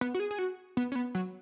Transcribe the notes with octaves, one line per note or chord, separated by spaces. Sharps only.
B3
F#4
G#4
G#4
F#4
B3
C#4
B3
F#3